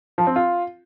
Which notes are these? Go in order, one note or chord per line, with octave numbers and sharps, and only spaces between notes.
F3
C4
F4